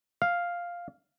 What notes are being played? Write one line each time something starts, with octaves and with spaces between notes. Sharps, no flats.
F5